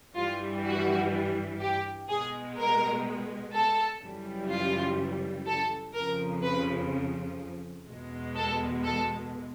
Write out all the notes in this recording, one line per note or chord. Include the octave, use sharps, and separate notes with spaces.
G2 E3 G3 F4
F#4
G4
B2 G#3 G#4
A#4
A4
F#2 C#3 E3 G3
F4
A4
F2 C#3 F3 A#4
B4
E2 B2 G#3
A4
A4